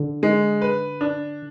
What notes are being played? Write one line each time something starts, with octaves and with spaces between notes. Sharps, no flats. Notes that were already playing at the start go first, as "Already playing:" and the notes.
Already playing: D3
G#3
B4
D4